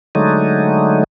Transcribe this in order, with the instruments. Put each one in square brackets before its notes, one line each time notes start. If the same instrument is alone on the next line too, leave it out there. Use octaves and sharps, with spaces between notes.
[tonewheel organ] D3 F#3 G#3 A3 D#4